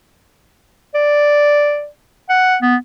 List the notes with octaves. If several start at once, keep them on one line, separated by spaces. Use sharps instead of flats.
D5
F#5
B3